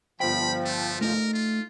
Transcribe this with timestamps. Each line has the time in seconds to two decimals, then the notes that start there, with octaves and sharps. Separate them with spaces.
0.20 G1 F3 C5 G5 B5
0.65 A3
1.01 A3 D#4 A#4
1.34 F4